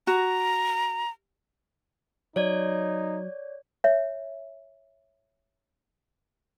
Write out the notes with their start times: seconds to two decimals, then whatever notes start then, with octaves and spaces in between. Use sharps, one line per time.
0.07 F#4 A#5
2.36 F#3 D#4 C#5 D5 G#6
3.84 C#5 E5